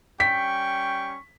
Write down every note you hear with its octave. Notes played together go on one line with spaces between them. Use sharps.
G3 C#4 G5 C#6 B6